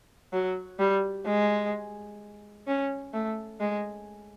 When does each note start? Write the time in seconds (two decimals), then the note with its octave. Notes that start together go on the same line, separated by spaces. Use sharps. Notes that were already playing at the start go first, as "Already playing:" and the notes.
0.33 F#3
0.79 G3
1.26 G#3
2.67 C#4
3.13 A3
3.60 G#3